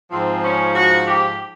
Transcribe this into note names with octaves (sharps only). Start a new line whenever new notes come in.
G#2 F3 C4
C#4
F#4
G4